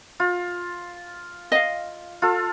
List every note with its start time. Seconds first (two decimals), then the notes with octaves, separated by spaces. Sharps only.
0.20 F4
1.52 D#5 F5
2.22 F4 A4